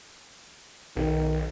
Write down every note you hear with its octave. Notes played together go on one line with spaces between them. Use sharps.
B1 D#3